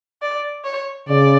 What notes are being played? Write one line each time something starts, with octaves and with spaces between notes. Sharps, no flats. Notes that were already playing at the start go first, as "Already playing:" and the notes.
D5
C#5
C#3 D5